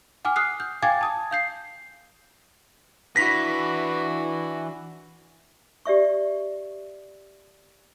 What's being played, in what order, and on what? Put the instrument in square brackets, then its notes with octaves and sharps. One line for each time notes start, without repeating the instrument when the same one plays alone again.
[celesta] F#5 G#5 D6 F6
D#6 F6 F#6 C7
G6
F5 G5 G#5 D6 G#6 A6
A5 D#6 G#6
F5 G6 C7
[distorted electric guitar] E3 B4 [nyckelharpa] D4 F#4 [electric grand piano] A#6 B6
[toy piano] G4 D5 E5 C#6